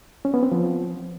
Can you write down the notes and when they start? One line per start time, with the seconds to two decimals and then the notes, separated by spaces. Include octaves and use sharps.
0.25 C#4
0.34 B3
0.43 C4
0.52 F3